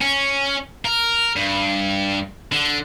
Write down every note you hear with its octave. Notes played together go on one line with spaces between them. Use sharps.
C#4
A#4
G2
D3